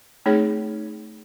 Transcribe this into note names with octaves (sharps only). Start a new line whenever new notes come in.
A3 C4 D#4 G#4 C#5